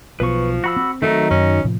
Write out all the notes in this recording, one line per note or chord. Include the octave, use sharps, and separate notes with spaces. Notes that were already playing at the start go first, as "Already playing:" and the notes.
B1 B2 F3 B4 C#6
F#4 B5 E6
C4
D#3 F#3 A3 D#4
F#2 C#4
A2 C3 F3